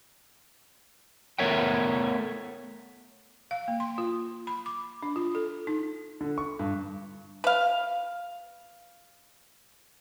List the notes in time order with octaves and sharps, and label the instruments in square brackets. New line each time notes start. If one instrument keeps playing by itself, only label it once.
[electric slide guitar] A3 B3 A#4 C#5 E5 G5
[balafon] F5
A#3
C6
F4
B5
D6
D4
F4
A4
D#4
[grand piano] D3
C#6
G2
[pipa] B4 F5